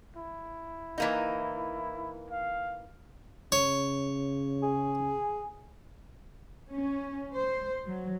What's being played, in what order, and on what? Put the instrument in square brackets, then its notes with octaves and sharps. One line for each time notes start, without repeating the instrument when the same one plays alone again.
[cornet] E4
[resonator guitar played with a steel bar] E3 A#3 D#4
[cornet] F5
[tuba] C#3 [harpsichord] C#5
[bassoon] G#4
[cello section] C#4
C5
F#3